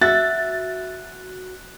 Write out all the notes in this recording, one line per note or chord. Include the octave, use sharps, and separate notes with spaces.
F#4 E5 F#6 A6